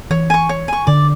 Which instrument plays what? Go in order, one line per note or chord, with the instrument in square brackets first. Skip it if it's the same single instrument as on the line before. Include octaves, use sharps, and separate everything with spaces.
[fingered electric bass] E3 [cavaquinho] C#5
[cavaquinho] G#5 C#6
C#5
G#5 C#6
[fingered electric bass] D3 [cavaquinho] D5